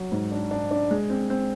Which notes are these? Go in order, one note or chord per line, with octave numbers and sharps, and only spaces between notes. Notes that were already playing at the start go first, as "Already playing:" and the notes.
Already playing: F#3
G#2
D4
D4
D4
G#3
C4
C4